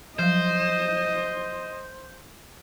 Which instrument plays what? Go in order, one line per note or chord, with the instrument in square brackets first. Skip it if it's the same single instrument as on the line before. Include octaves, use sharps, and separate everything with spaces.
[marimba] F3 F#3 [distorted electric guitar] C5 [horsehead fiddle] D#5